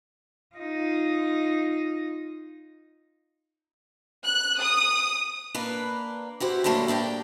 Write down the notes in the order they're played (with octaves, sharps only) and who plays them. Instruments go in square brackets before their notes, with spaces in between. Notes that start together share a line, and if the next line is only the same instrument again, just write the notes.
[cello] D#4 F4
[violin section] F#6
D#6
[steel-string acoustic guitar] A#3 D4 B4
E4 F#4 G4 C5
D3 F#3 G3 A3 A#3
A#3 D4 G4 G5